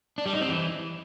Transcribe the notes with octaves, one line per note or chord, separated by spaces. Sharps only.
D4
G3
D#4
C4
E3